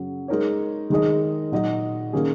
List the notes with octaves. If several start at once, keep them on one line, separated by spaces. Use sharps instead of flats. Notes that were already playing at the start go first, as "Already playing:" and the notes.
Already playing: F#2 C#3 F#3
G#3 D#4 A#4 C#5
D#3 G#3 D#4 G#4 D#5
A#2 F#3 D#4 F#4 D#5
D#3 A#3 C#4 G#4